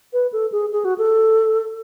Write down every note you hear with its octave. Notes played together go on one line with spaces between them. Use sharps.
B4
A4
G#4
G#4
F#4
A4